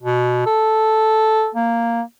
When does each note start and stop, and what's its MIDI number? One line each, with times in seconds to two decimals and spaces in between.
0.02 0.42 47
0.46 1.49 69
1.55 2.02 58